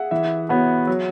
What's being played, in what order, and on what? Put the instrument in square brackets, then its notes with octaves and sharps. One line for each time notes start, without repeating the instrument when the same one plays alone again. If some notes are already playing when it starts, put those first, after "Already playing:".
Already playing: [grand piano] G#4 E5 F#5
[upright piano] E3 [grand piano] E5
[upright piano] B3 F#4 C#5
F#3